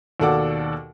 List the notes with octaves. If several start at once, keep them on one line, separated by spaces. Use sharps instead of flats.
D#2 B2 A4 D5 F#5 D6